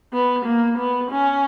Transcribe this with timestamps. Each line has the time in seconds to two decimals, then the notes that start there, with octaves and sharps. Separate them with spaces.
0.13 B3
0.45 A#3
0.78 B3
1.11 C#4